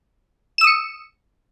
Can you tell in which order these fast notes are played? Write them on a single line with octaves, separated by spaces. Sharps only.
E7 E6 D#6 C#7